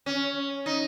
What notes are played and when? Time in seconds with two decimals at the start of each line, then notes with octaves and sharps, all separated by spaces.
0.06 C#4
0.66 D#4